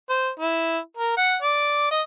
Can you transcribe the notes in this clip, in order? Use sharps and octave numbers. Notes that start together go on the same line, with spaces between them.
C5
E4
A#4
F#5
D5
D#5